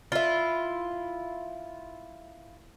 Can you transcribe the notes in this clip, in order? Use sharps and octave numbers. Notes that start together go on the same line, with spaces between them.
E4 F4